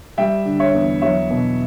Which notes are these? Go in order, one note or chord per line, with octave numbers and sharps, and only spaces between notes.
G3 E5 G5
D3
C#5 E5
E2
F#3 C#5 E5
B2